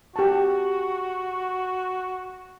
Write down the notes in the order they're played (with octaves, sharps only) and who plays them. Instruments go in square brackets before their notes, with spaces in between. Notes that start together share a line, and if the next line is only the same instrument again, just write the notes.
[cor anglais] F#4 [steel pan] G4 A5